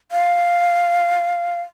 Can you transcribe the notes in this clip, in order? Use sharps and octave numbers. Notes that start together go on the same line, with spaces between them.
F5